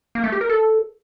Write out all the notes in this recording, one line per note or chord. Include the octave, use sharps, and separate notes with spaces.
A#3
A3
G4
A#4
A4